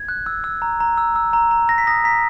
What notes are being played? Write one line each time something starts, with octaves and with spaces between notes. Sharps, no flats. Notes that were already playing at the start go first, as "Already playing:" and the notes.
Already playing: G#6
F#6
E6
E6
A#5
A#5
E6
E6
A#5
A#5
A#5 A#6
B6
D#6 A#6
A#5 B6